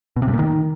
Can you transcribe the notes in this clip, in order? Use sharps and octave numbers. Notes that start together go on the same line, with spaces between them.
B2
C3
G2
A#2
D#3